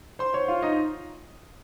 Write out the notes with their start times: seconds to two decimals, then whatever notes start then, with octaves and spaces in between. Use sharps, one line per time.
0.19 C5 C6
0.34 C#5 C#6
0.48 F4 F5
0.63 D#4 D#5